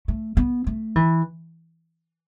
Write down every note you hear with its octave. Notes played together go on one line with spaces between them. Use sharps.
A3
B3
A3
E3